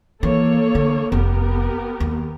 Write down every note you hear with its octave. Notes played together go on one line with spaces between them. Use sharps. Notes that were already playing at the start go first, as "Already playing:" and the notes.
E3 A#3 A4 C#5
D3
F1 B3 G4 A#4
D#2